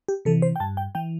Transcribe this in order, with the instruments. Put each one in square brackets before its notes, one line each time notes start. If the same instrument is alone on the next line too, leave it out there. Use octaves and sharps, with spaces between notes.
[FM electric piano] G4
C3 E3 A4
C5
G5
G2 A5
G5
E3 G5